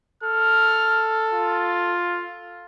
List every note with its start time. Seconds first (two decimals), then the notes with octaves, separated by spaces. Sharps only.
0.23 A4 F6
1.33 F4